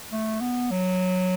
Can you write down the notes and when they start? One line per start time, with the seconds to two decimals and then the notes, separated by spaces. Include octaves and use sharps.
0.12 A3
0.41 B3
0.71 F#3